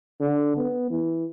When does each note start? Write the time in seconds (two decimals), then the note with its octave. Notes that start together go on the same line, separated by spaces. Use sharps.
0.20 D3
0.57 B3
0.90 E3